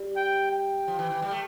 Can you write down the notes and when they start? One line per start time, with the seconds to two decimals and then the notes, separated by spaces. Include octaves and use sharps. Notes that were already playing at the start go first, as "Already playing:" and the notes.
Already playing: G3
0.16 G5
0.52 G5
0.88 F3
0.99 E3
1.10 E3
1.22 G3
1.31 A3